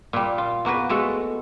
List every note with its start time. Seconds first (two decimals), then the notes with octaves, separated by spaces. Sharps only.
0.13 A#2 G3
0.38 F4
0.65 E2 A#3 F#4 B4
0.89 G#3 A3 F#4 A4